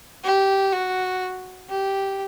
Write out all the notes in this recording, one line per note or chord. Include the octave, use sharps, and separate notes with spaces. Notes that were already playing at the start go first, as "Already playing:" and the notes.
G4
F#4
G4